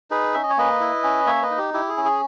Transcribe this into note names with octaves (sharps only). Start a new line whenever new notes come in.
D#4 G#4 B4
C#4 E5
D#5
C#5
A#3 B4 D#5
E4
C#4
A#3 C#5 E5
B4 D#5
D#4
G4
E4 G4
G#4
C#4
G#4